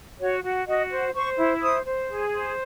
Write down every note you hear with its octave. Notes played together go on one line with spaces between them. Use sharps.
F#4 C#5
F#4
F#4 D#5
C5
C5 C#6
E4
C5 D#6
C5
G#4
C5